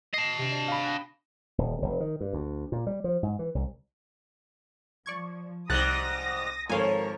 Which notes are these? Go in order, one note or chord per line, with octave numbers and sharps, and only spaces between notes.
D#5 A5 C7
C3 D4
D5 A#6
F5 B5
G5 G#5 F#6
D#1
F1
D#3
G2
D2
A#2
G3
F3
G#2
E3
C2
F3 D5 C#6 G#6
C2 G#2 G3 D#6 F#6 A6 A#6 F#7
G#1 F3 A4 A#4 C#5 F5 G#5